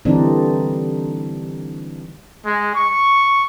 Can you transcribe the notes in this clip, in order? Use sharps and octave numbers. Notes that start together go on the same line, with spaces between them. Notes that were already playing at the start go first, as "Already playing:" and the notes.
D3 E3 G3 C4 D4 D#4
G#3
C#6